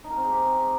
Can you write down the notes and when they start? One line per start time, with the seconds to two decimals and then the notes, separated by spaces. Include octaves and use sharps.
0.04 D#4
0.11 A#4
0.17 C4
0.23 G#4
0.30 G4